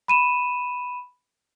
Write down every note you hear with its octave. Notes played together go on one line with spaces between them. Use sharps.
B5 D#7 E7